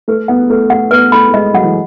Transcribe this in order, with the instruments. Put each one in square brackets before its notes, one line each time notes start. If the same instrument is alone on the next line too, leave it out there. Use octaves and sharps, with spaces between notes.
[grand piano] A3 [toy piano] B4
[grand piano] B3 [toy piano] F#5
[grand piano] A3 [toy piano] B4
[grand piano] A3 [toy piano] F#5
[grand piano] B3 [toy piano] B4
[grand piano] A3 [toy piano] B5
[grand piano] A3
[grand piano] G#3 [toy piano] D#5
[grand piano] F#3 [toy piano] F#5
[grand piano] E3